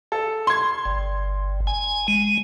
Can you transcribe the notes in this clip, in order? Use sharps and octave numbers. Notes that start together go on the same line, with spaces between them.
A4
C6 G#6
G1
G#5
G#3